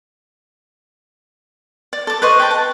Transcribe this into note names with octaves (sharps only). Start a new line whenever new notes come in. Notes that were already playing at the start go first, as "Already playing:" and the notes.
D5
A4 D6
B4 C5 D#5 C#6
G5 A5
F#5 A5